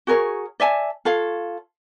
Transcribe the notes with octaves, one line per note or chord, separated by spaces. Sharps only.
F#4 G#4 A#4 C#5
D5 E5 G#5 A5
F4 A4 C#5 F5